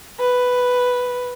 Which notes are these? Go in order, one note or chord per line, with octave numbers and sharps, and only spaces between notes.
B4